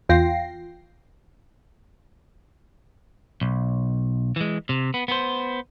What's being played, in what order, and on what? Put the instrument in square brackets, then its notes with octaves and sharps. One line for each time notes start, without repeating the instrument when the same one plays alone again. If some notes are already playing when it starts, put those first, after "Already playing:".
[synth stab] E2 F4 G5 A#6 C7
[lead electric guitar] B1
E3 G#3
C3
B3
B3 C5